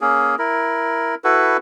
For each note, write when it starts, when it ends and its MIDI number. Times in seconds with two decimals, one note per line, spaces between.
0.01 0.35 58
0.01 0.35 61
0.01 0.35 68
0.39 1.15 64
0.39 1.15 70
1.24 1.57 64
1.24 1.57 66
1.24 1.57 69
1.24 1.57 71